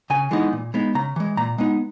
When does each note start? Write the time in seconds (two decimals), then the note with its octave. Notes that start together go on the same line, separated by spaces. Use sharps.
0.10 C#3 G#5
0.31 E3 G#3 B3 D#4
0.53 A#2
0.74 G#3 B3 D#4
0.95 C#3 A#5
1.16 E3 G#3
1.37 A#2 A#5
1.58 G#3 B3 D#4